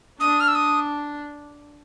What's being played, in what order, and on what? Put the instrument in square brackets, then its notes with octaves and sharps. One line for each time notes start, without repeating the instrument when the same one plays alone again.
[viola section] D4 [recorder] D#6
[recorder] F6
E6
D#6